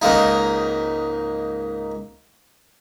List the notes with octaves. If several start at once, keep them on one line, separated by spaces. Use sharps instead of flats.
C#2 G#2 A#3 D#4